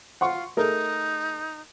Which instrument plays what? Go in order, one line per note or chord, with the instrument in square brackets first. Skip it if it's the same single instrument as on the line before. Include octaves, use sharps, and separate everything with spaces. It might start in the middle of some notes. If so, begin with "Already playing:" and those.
[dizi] F4 [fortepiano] F#5 C6 C#6
[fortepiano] A3 G#4 A#4 [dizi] D#4